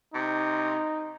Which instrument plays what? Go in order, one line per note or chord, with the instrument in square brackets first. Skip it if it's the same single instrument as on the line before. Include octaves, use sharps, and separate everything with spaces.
[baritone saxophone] C3 [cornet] D#4